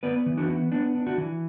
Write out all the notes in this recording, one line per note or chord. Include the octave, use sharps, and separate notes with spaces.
B3 B4 D5
E3
D4 F#4
B3
B3 D4
D4
D4 F#4
E3